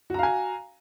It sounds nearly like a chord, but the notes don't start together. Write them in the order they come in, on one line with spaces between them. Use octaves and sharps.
F#4 A#5 F5 G#5